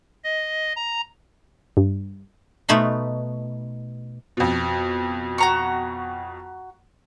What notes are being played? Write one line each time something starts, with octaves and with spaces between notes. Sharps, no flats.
D#5
A#5
G2
B2 A3 D#4 B5 C6
F2 B2
F#4 A#5 C#6